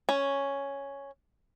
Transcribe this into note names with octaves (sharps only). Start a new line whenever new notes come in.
C#4